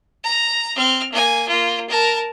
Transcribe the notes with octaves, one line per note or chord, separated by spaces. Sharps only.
A#5
C4 F6
A#3 G#5
A#3 F4
A#4 A5